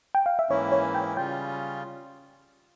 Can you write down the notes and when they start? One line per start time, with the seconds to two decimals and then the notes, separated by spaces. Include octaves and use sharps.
0.15 G5
0.26 F5
0.39 E5
0.50 G#2 E3 A#3 C#4 E4 C#5
0.72 C#5
0.95 G5
1.16 C#3 G3 C#4 F4 G5